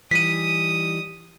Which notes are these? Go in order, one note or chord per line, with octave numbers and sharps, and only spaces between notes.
E3 G3 D#4 D#6 B6 D#7